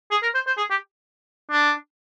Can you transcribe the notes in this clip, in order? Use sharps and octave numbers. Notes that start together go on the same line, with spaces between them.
G#4
A#4
C5
C5
G#4
G4
D4